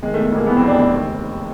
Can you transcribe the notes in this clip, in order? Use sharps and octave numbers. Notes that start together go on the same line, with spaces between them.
D#3 G#3
A3
E2
A3
E1 A#3
E3 B3
F2 C4
D4
F1 C4
D#2